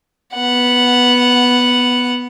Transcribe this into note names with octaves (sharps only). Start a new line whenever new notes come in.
B3 F#5